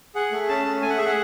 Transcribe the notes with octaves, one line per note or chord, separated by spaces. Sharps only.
G#4 F#5
A3
C#4 A5
A3
A3 G#5
F#5
G#4 E5
F#5